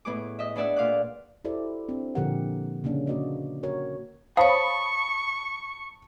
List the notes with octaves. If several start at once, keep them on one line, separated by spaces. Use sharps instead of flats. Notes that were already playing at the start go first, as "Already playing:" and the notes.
A2 B3 G#4 D6
D#5 E5
B3 D4 G#4 D5 E5 F#5
A#2 F5 D6 F#6
E4 F#4 G4 A4 C5 D5
C4 D4
A#2 D3 F3 G4 A#4 F#5
C#3 A#3 C#4 D4
A#3 F#4 B4 D5 D#5
F#4 A#4 C#5
C5 C#5 F5 A5 B5 C#6 D#6